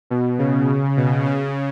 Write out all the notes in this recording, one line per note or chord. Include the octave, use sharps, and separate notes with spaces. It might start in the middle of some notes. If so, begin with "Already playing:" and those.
B2
C#3
B2
C#3